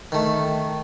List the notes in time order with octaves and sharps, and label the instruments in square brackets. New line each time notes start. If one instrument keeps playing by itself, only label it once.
[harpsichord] D#3 A3